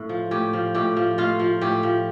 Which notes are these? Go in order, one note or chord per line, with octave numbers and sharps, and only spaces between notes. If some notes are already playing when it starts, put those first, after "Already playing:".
Already playing: A2
F3
A2 G4
F3
A2 G4
F3
A2 F4
F3
A2 G4
F3